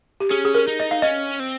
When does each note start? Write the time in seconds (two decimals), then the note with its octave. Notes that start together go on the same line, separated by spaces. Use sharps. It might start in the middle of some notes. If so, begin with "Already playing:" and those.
0.20 G4
0.30 C#4 G#4
0.45 G#4
0.55 A#4
0.67 D#4
0.80 D#5
0.91 F5
1.02 C#4 D#5
1.39 C4